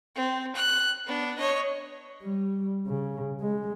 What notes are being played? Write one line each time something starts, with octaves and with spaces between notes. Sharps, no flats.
C4
F#6
B3 D4
C#5 D#5
G3
C#3
G#3